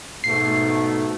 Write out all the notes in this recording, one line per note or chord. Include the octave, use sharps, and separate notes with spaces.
G#2 B2 A3 C7